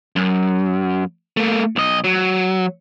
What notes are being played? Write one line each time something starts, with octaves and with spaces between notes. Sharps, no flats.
F#2
A3 A#3
B1 D#5
F#3